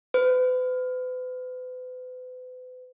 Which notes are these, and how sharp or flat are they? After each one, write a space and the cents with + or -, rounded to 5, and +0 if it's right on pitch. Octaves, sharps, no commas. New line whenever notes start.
B4 +40